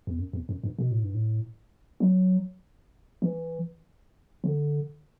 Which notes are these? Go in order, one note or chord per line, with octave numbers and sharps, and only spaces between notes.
E2
F#2
E2
F#2
G2
B2
A2
G2
A2
F#3
E3
D3